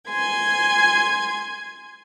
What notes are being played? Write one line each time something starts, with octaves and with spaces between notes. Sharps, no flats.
G#5 C6 G#6